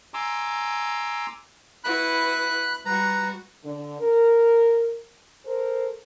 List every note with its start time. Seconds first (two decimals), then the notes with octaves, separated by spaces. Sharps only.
0.14 G#5 A#5 C6 D6 E6
1.84 E4 F#4 B4 B5 F#6
2.86 G3 F#4 B4 A#5
3.64 D3
4.00 A#4
5.45 A4 A#4 C5